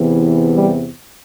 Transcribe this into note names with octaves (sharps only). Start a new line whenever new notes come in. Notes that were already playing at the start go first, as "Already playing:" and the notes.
Already playing: E2 C3 E3
G3